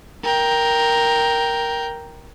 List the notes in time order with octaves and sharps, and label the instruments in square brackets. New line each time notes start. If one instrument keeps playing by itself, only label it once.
[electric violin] A#4 G5